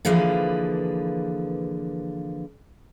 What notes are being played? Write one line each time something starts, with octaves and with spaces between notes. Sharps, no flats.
D3 E3 F3 A#3 G#4 B4